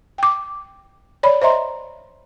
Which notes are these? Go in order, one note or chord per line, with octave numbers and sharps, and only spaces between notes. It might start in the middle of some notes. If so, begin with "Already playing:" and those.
G5 D6
C#5 D5 B5
C5 D#5 E5 A#5 C6